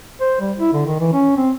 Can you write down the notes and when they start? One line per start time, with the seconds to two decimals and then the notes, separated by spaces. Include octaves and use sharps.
0.20 C5
0.40 G3
0.59 E4
0.73 D3
0.87 D#3
1.00 E3
1.13 C#4
1.37 C4